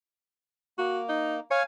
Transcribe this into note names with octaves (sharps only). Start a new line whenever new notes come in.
A#3 F#4
D#4
C#5 F5 G#5